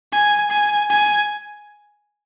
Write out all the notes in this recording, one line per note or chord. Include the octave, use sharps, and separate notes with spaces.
G#5
G#5
G#5